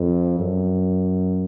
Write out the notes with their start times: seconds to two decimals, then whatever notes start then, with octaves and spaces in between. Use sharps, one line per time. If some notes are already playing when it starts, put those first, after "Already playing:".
Already playing: F2
0.39 F#2